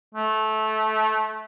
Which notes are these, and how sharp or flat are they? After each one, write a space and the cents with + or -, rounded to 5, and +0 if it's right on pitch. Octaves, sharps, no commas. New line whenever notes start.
A3 -20